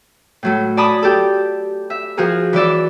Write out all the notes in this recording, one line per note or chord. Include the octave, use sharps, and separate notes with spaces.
A2 F#3 A3
D5 G#5 A5 B5 D6 D#6
G4 A4
E5
F3 F#4 G#4 A#4
E3 F#3 D5 E5